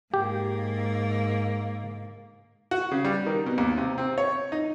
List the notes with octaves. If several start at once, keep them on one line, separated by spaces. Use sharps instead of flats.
G#2 A#3 G4
F#4
C#3
G3
D#3
B2
D#2
C3
C4
C#5
D#4